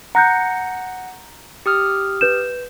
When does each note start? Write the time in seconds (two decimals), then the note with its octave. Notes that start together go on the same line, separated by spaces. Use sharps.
0.15 F#5 A#5 F#6 G6 A#6 C#7
1.66 G4 D#6 F6
2.21 B4 G6 E7